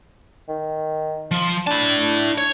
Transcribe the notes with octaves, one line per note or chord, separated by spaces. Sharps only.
D#3
F3
D4 E4 A5
C#5